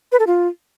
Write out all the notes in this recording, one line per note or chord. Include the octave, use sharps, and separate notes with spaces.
B4
A4
F4